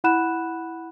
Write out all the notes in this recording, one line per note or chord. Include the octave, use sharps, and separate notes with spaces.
E4 F#5 B5 F#6 E7